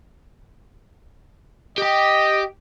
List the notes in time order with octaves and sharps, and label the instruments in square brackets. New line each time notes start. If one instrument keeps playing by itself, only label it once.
[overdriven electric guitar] G4 G5 [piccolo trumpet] D#5